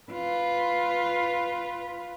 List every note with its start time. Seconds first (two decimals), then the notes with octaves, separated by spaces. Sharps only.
0.11 F4 B4